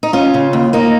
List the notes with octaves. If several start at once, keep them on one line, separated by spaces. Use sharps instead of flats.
D#4
C#4 F4
C#3
D#2
A#3 D#4